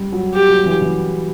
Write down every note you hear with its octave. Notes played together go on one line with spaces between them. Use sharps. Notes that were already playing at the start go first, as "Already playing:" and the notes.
Already playing: G3
F#3
G4
F#3
E3
E3